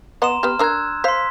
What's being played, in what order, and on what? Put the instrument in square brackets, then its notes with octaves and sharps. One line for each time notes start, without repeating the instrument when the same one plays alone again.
[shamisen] B3 D#5 F#5 [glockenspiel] A#5 C6 E7
[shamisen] B3 G4 [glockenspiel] F6
[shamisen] D4 A#4 A#5 [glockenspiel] E6 F#6 G#6
[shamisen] C5 F5 [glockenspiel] C6 B6